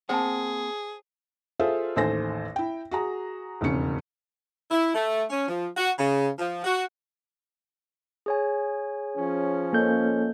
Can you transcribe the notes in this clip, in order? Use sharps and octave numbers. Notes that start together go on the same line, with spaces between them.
A#3 C4 G#4 C5 F#5 G5 A5
F4 G#4 A4 C5 E5 F5
A1 D#2 A4 C5 G#5 A#6
E4 G5
F#4 G#4 A#5
E1 F2 G#2 C#3 C#4 C#7
E4
A3
C#4
F3
F#4
C#3
F3
F#4
G#4 C#5 G#5
F3 C#4
A#3 A4 C5 D#5 G6